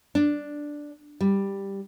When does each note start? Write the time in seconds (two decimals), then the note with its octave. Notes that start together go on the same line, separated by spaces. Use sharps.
0.15 D4
1.21 G3